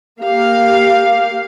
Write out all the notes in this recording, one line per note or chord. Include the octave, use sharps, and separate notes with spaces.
A#3 G4 F5